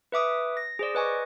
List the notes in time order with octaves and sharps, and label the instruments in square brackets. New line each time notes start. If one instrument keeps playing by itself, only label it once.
[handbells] B4 E5 D6 D#6
A#6
G#4 C5 D5
B4 D#5 G#5 C#6 D6